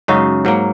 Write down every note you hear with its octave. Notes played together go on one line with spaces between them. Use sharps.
F#2 C#3 G#3 D#4 F#4
G#2 F#3 A#3